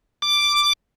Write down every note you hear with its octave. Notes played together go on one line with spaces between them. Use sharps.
D6